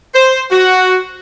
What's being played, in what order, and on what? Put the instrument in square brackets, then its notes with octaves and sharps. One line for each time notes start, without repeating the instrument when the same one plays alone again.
[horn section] C5
F#4